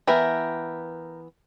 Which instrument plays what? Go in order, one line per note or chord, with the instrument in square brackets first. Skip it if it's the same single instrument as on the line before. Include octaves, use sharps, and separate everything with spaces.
[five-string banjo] E3 B3 [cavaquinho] A#4 E5 G5